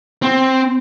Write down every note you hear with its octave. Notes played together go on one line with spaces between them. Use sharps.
C4